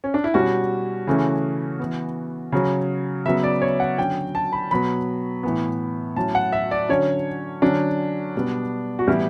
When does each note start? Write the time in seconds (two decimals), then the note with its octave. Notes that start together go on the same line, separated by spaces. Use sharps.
0.04 C#4
0.14 D4
0.24 E4
0.34 B2 G3 C#4 F#4
1.07 C#3 E3 A3 C#4
1.79 E3 B3
2.52 C#3 F#3 C#4
3.25 C#3 F#3 B3 E5
3.44 D5
3.62 C#5
3.80 F#5
3.98 D3 F#3 C#4 G5
4.35 A5
4.53 B5
4.71 B2 F#3 B3 B5
5.43 A2 E3 B3
6.16 A2 F#3 C#4 A5
6.35 F#5
6.52 E5
6.71 D5
6.89 D3 F#3 C#4 C#5
7.62 D3 F#3 C#4 D4
8.36 B2 G3 B3
8.99 F#4
9.08 A2 E3 G3 B3 E4